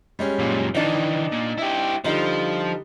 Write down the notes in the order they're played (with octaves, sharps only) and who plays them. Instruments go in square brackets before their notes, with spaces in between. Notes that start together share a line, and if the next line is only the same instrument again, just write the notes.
[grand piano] G3 G#3 C#4
[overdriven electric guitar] F#2 A#2
[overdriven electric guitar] D#3 E3 [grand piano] D4 D#4
[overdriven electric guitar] A#2
E4 G4
[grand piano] D3 G3 D#4 [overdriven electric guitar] F3